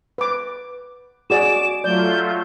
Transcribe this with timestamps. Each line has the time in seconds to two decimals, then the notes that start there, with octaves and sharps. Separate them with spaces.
0.18 B4 D6
1.30 F#4 G#4 D5 D6 E7
1.84 F#3 A3 F4 D5 G6